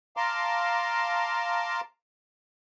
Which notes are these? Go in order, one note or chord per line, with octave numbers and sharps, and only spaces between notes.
F5 A5 A#5 C6 D6